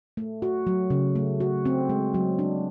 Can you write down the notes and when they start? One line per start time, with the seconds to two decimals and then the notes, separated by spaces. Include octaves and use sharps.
0.17 A3
0.42 F#4
0.67 F#3
0.90 C#3
1.15 A3
1.40 F#4
1.65 C4
1.89 G#3
2.14 F#3
2.39 D4